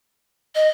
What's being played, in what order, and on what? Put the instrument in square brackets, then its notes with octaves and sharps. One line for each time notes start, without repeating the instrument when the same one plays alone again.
[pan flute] D#5